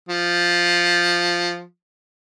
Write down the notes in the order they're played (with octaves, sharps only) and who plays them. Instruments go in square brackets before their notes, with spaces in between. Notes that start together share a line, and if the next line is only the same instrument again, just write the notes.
[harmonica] F3